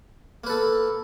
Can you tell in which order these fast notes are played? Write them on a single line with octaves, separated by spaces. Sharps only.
A#3 B4 A4